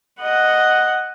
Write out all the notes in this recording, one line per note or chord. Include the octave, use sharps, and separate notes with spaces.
D#5 F#5